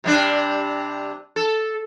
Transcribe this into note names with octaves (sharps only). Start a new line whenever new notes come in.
C3 G3 D4
A4